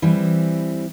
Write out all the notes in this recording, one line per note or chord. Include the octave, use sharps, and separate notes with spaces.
E3 G3 C4